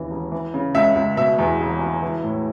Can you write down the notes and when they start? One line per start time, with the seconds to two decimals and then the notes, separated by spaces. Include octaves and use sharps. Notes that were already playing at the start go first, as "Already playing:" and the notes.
Already playing: D#2 C#3 E3
0.11 E1
0.32 E3
0.54 C#3
0.75 C#2 E5
0.96 C#2
1.17 B2 E5
1.39 E2
1.60 E1
1.81 E1
2.02 E3
2.24 A2